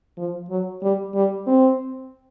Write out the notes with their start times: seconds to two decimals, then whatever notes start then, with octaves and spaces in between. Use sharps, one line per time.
0.17 F3
0.50 F#3
0.82 G3
1.15 G3
1.47 C4